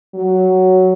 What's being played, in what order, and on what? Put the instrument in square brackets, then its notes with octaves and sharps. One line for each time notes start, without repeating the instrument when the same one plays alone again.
[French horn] F#3